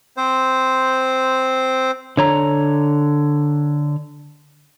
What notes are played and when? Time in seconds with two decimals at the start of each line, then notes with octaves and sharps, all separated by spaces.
0.17 C4 C5
2.17 D3 C#5 A#5